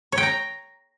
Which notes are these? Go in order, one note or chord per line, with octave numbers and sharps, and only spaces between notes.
C#5
G5
A#5